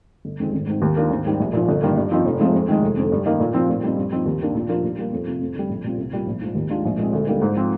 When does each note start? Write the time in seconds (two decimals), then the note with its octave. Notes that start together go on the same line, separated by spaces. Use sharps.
0.25 G1
0.40 F2 D#3 G#3 C4
0.53 G#1
0.67 G#2 D#3
0.82 D#2
0.96 D#3 A#3 D4 F4
1.11 G#1
1.26 G#2 D#3 G3
1.40 A#1
1.53 A#2 F3
1.68 G1
1.82 G2 D#3 A#3
1.97 G2
2.12 F3 C4 D#4
2.25 F1
2.40 F2 C3 F3 G#3
2.54 F2
2.68 D#3 G#3
2.82 F1
2.97 F2 D3
3.12 G2
3.26 D#3 A#3 D#4
3.40 A#2
3.54 F3 C4 F4
3.69 A#2
3.84 G3 C4 D#4
3.97 G2
4.12 F3 C4 D#4
4.26 D#2
4.41 D#3 A#3 D4
4.54 A#2
4.69 F3 A#3 D4 F4
4.83 A#2
4.98 G3 A#3
5.13 F2
5.27 C3 F3
5.41 F2
5.55 D3 G3
5.69 A#1
5.84 A#2 G3 C4 F4
5.98 C2
6.13 A#2 G3
6.27 A#1
6.41 G#2 F3
6.55 D#2
6.70 D#3 G#3 D4 F4
6.85 A#1
6.98 A#2 G#3 C4
7.13 D2
7.27 D3 G3 A#3 D#4
7.42 G#2
7.56 F3 C4 F4